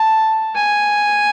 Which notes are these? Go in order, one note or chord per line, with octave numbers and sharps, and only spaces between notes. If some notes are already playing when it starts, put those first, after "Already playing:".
Already playing: A5
G#5